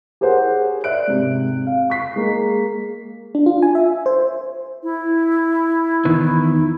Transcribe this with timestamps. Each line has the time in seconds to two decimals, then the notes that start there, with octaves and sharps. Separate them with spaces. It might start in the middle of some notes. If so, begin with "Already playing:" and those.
0.21 G4 G#4 A#4 C5 C#5 F#5
0.84 D5 E5 F#6 D7
1.08 G#2 C3
1.67 F5
1.90 C#6 B6 C7
2.16 G#3 A#3
3.35 D4
3.46 F4
3.63 G#5
3.75 E5
4.06 C5
4.83 E4
6.05 E2 D#3 E3